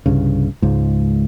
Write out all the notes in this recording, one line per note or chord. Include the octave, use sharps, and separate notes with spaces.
C2 G2 C#3
C#2 G#2